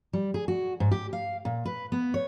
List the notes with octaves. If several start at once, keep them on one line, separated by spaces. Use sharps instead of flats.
G3
G#4
F#4
G#2
G4
F5
A#2
B4
B3
C#5